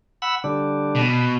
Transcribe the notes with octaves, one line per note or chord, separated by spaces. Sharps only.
F#5 B5 E6
D3 G3 D4
B2